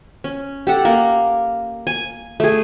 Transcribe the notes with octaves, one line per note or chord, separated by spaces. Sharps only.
C#4
G4 A4 F#5
A#3 A#4
G#5
A3 G#4